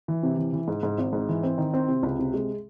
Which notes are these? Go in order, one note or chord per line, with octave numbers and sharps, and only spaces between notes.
E3
C3
E3
E3
G#2
G#2
G#1
G#2
E3
C4
D#3
C4
C3
C#2
C3
G#3